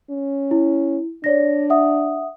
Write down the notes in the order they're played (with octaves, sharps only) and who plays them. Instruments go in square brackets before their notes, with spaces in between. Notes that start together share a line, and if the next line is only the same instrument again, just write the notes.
[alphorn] C#4
[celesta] E4
[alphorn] D4 [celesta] C#5 D5 A#6
[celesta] E5 F#5 D#6